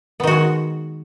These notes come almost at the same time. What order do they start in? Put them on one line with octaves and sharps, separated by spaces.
B3 D#3 F#4 G#3